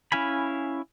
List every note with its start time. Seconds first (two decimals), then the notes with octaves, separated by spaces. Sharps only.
0.12 C#4 E4 F5 G#5 B5